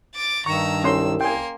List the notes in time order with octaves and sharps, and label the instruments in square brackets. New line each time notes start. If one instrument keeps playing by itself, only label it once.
[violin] D6 A6
[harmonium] G2 D#3 [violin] A#5 E6 [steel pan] C#6
[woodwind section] C2 [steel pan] C#4 C6 [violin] E6
[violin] A#3 C6 [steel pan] G5 G#5